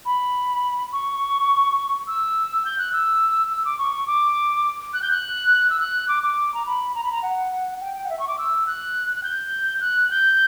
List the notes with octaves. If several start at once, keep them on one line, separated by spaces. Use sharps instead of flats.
B5
C#6
E6
G6
F#6
E6
E6
D6
C#6
D6
F#6
G6
F#6
E6
F#6
D6
D6
A#5
B5
A#5
B5
A#5
F#5
G5
G5
F#5
E5
C#6
D6
E6
F#6
F#6
G6
F#6
G6